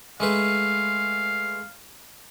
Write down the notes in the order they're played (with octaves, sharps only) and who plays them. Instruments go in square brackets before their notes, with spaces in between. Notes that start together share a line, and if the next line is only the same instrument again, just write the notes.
[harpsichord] G#3 A3 B4 [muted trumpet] F5